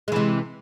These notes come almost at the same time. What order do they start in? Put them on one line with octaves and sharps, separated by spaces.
G#3 E3 C3